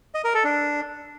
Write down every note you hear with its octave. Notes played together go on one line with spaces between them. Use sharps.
D#5
A#4
A4
D4